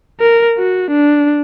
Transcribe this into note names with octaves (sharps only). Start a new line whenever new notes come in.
A#4
F#4
D4